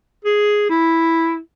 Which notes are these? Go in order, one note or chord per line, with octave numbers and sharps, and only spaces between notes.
G#4
E4